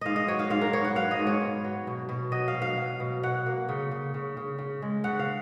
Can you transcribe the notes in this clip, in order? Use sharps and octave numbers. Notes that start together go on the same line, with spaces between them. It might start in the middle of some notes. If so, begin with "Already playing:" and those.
G#2 D#5 F5
D#5
F#3 C#5
F5
G#2 F5
A#4
B3 C#5
F#5
F#3 F5
D#5
G#2
C#5
B3
F#3
B2
B2
F#3 D#5
F5
B2
F5
F#3
B2
B2 F#5
A#3
C#3
C#3
C#3
C#3
C#3
G#3
C#3 F#5
F5